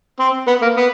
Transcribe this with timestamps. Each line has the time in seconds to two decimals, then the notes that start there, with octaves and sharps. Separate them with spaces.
0.20 C4
0.47 B3
0.62 A#3
0.77 B3